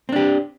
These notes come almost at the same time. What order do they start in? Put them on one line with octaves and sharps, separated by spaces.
C4 D4 G4